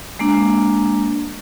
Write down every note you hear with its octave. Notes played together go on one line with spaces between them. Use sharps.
G#3 A#3 D4